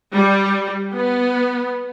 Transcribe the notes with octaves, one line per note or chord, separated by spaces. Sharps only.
G3
B3